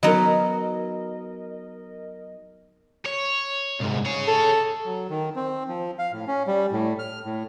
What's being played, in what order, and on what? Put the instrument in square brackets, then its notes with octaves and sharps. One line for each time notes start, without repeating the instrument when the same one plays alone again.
[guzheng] F#3 B3 D#4 [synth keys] A#4 D#5
[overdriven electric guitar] C#5
C2 G#2
G#4 C#5
[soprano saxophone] A4
[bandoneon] F#3
D#3
C4
F3
F5
A2
C#4
G3
A2
F6
A2